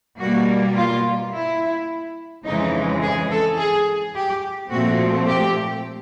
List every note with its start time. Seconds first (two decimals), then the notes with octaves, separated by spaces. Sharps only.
0.19 B2 G3 A#3 F#4
0.76 F4
1.33 E4
2.45 F2 C#3 E3 G#3 D#4
3.02 G#4
3.30 A4
3.59 G#4
4.15 G4
4.71 A#2 F3 A3 C4 F#4
5.28 G4